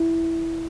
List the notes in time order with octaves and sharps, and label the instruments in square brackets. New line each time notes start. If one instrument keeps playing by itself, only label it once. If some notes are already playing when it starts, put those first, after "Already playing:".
Already playing: [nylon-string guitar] E4